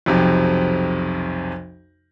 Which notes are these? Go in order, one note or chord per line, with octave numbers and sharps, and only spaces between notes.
B1 F2 C3